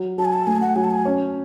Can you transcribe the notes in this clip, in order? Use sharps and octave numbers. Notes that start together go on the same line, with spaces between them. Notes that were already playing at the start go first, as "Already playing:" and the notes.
Already playing: F#3
F#3 A5
G#5
A5
A3 G#5
F#5
F#3 G#5
A5
G#5
C#4